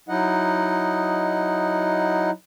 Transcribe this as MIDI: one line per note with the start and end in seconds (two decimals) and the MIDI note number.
0.09 2.30 54
0.09 2.30 63
0.09 2.30 64
0.09 2.30 75
0.09 2.30 78